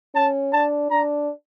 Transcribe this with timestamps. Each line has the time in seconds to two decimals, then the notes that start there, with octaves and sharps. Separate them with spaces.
0.15 C#4 A5
0.53 D4 A5
0.90 D4 A#5